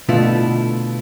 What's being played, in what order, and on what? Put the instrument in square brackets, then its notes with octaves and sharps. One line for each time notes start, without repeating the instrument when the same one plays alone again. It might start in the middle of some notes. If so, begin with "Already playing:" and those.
[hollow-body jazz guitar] B2 D3 A3 B3 E4 F4